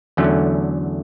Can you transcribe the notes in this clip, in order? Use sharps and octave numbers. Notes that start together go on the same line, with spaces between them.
E2 D3 F#3 A3 C#4